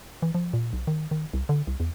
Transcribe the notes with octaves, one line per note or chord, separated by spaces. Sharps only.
E3
F3
A#2
B1
D#3
D#3
C2
D3
C2
E2